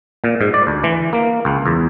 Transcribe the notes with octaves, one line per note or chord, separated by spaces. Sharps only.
A#2
G#2
D5
D2
E3
A#3
C#2
E2